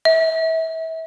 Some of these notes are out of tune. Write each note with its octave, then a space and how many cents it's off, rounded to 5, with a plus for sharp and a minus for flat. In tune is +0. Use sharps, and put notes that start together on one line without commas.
E5 -30